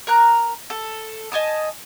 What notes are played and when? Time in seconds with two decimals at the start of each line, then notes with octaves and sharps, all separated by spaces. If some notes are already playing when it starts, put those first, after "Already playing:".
0.07 A#4 A#5 F#6
0.70 A4
1.32 D#5 G#5 A5 D#6